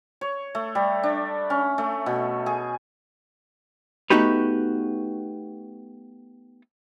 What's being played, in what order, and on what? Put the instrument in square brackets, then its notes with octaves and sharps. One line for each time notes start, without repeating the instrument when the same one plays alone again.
[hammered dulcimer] C#5
A3
G3
D4
C#4
A3
B2
G#4
[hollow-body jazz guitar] A3 B3 D#4 F#4 G4 B4